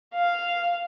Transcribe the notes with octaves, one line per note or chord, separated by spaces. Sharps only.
F5